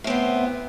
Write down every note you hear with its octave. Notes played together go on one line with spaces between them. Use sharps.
A2 B3 C4